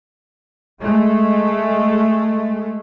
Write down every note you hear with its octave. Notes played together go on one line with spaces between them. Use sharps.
G#3 A3